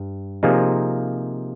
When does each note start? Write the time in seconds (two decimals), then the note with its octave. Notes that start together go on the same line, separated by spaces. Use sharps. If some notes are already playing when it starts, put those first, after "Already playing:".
Already playing: G2
0.43 C3 F3 A#3 D#4 G#4